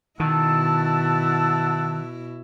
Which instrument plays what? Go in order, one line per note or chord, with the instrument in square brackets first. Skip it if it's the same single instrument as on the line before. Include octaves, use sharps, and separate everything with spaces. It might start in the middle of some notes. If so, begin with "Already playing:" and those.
[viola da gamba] B2 E4 [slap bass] D#3 [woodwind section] F#5 A5 E6